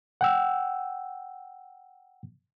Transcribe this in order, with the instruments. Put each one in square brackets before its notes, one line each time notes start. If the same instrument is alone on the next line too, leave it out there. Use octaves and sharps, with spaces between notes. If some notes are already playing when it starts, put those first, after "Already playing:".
[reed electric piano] F#5 G5 E6